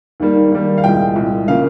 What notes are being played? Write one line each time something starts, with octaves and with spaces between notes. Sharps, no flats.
D#2 D#3 G3 A#3
D#2 D#3 G3 A#3
F5
C2 A#2 G#3 G5
C2 A#2 G#3
C#3 F3 A#3 F5